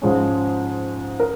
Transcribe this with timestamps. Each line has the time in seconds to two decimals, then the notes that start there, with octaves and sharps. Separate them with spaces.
0.02 G#2 F3 G#3 C#4
1.20 A#4